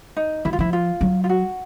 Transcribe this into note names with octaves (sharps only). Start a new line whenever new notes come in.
D#4
E3 E4
F4
F3 E4
F4
F#3
F4
F#4